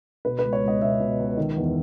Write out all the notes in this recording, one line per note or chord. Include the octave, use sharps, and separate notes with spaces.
B2 B4
B4
C#2
C#5
C#2
D#5
B2 E5
B2
C#2
D#3
E2